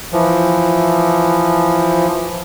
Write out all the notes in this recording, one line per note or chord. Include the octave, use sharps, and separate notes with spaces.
E3 F3